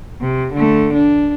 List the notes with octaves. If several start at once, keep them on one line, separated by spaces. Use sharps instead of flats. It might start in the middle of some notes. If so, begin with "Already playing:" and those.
C3
D3 A3
D4